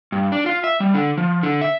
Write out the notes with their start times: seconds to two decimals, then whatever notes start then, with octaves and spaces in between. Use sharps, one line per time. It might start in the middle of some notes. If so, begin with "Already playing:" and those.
0.12 G2
0.32 D4
0.46 F4
0.64 E5
0.80 G3
0.94 D3
1.18 F3
1.43 D3
1.61 E5